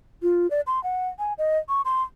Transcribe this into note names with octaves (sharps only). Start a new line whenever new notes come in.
F4
D5
C6
F#5
G#5
D#5
C#6
C6